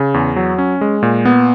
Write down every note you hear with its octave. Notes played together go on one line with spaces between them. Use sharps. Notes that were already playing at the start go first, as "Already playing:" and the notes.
Already playing: C#3
E2
F#3
C#4
G#3
A#2
B3